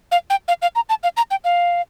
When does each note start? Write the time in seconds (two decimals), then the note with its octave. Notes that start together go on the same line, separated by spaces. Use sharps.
0.12 F5
0.30 G5
0.48 F5
0.62 F5
0.75 A#5
0.89 A5
1.03 F5
1.17 A#5
1.31 G5
1.44 F5